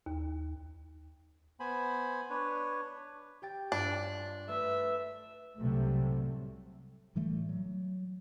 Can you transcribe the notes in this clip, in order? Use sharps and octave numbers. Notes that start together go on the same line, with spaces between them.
D#2
B3 C5 G#5 B5
D4 B4 C#5
G4 G5 A6
G2 D4 F4
A3 B4 E5 A6
C2 A2 C3 F#3 G3 A3
A2 E3 G3 A3
F#3